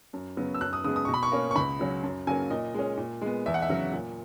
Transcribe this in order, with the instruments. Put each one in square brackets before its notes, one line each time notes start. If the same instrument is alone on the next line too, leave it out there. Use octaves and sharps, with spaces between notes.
[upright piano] F#2
C#3 F#3 B3
E6
F#2 F#6
D#6
C#3 D#6
G#3 B3
D#6
B2 C#6
B5
C#6
A#3 C#4
C#6
C#2 B5
C#3 F#3 C#4
F#2
C#3 F#3 A#3 C#4 G#5
A#2 D#5
G#3 C#4
A#2
G#3 B3
E2 E5
F#5
E5
C#3 F#3
A#2